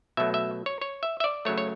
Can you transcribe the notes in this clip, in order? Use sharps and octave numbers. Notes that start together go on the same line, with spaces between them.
B2 F#3 A3 E5
E5
C#5
C#5
E5
E5
D5
C#3 F#3 A3 C#5
C#5